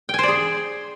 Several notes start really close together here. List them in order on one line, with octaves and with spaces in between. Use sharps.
G5 G#5 C5 D5 G#4